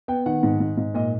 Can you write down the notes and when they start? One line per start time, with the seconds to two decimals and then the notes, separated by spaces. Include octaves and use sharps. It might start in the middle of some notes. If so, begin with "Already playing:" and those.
0.08 B3 G5
0.26 D#3 F#5
0.43 G#2
0.60 G#2
0.77 G#2
0.94 A#2 D#5